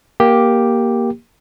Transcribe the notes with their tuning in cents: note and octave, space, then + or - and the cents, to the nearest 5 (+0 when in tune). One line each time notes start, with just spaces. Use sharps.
A#3 +10 G4 +0